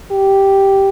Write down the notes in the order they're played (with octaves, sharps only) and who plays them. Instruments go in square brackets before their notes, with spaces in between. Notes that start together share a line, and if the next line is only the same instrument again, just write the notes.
[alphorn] G4